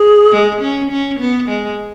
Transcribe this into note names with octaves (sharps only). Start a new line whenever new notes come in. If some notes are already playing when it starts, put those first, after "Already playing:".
Already playing: G#4
G#3
C#4
C#4
B3
G#3